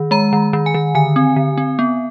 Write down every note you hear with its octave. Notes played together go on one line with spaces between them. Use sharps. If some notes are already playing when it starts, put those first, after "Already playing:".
Already playing: D#3
G#3 A#5
D#3
D#3
G#5
D#3
D3 G#5
C4
D3
C4
B3